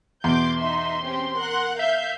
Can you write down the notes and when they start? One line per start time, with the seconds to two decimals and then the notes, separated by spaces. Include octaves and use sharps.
0.24 E2 B2 C6 D6 G6
0.59 D#4 E5
1.03 C4 C#4 G4
1.39 A#4 F#5 F#6
1.79 E5 F5 G6